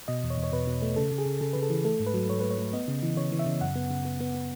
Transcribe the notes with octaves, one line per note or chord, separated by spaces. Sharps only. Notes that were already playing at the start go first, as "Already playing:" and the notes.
B2 D#5
E2
C#5
E2
C#5
B2 B4
B2
A3
C#3 A4
C#3
G#4
C#3
C#3 A4
C#3 B4
A4
E3
A3 A4
G#2
B4
F#3
G#2 C#5
A3 B4
C#5
A3
B3 D#5
C#3
E3
C#3 C#5
E3
E5
C#3
F#2 F#5
B3
C#3
B3
B3
B3